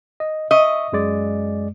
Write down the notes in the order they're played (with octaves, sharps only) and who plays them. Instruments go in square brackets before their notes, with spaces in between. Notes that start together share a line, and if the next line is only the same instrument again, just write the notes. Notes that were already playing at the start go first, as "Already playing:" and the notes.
[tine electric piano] D#5
[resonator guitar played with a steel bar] D#5 [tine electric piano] E5 C#6
[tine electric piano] F#2 G#3 D5